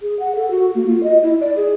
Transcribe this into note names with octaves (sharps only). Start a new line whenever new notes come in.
G#4
F#5
A4
F#4
A#3
F4
D#5
E4
D5
G#4